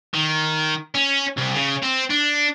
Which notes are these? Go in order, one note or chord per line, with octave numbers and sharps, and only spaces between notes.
D#3
C#4
C2
C#3
C4
D4